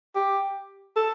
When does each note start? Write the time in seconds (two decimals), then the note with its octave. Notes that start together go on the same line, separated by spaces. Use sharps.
0.15 G4
0.96 A4